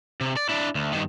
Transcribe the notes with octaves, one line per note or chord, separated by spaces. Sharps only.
C3
D5
D4 E4
D2
G2 D#3